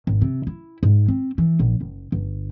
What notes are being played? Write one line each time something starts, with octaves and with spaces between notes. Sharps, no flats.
G#1
C3
E4
G#2
C4
E3
A#1
F#1
G1